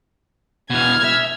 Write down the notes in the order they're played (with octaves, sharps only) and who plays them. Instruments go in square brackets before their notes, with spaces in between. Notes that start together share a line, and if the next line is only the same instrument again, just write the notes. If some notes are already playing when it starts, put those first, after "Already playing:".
[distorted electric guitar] B2 E3 [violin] F6 G#6
[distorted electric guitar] E5